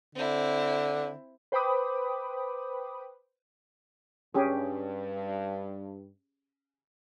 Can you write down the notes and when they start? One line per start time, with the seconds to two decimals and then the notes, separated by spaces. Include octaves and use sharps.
0.15 D3 C4 E4
1.52 B4 C5 G5 B5 D6 D#6
4.34 G2 C#4 G4 G#4